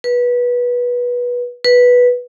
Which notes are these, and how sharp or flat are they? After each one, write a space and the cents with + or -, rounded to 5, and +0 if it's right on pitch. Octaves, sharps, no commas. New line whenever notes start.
B4 -20
B4 -5